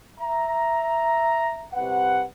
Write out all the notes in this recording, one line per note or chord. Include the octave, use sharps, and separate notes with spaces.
E5 A#5
C2 C3 B4 F#5